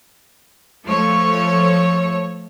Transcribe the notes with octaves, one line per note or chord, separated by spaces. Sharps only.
F3 A3 A4 C#5